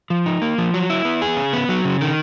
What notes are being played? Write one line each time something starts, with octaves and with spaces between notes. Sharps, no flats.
F3
D#4
A#3
F3
F#3
E4
B3
G#4
C#3
B3
F#3
C#3
D#3